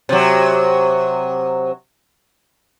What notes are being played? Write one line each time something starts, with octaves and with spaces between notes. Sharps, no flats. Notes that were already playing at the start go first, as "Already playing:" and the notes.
C3 F#3